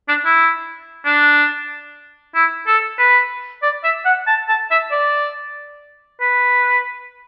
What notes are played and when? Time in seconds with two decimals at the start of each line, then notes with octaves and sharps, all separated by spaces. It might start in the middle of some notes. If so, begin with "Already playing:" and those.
0.08 D4
0.25 E4
1.06 D4
2.35 E4
2.67 A4
2.99 B4
3.63 D5
3.84 E5
4.05 F#5
4.27 A5
4.49 A5
4.71 E5
4.92 D5
6.21 B4